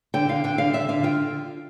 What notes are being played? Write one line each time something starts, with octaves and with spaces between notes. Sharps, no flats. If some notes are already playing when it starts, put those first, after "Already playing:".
D3 G5
D3 F5
D3 G5
D3 F5
D3 E5
D3 F5
F4 G5